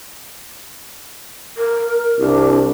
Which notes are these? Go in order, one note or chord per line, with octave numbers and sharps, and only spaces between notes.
A#4
C2 D4